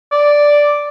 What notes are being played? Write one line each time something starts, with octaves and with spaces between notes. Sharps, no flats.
D5